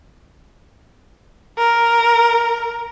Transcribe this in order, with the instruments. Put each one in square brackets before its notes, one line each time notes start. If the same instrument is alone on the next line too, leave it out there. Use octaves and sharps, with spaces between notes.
[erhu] A#4